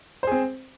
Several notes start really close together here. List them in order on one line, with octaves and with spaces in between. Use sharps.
C5 G#4 C4